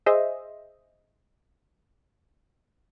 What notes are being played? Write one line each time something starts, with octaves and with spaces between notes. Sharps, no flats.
G#4 C5 D#5 E5